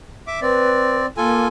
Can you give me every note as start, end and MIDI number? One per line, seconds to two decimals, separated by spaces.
0.27 0.40 76
0.27 0.40 86
0.42 1.06 60
0.42 0.98 71
0.42 1.06 74
1.17 1.46 58
1.17 1.48 65
1.17 1.48 69
1.17 1.48 80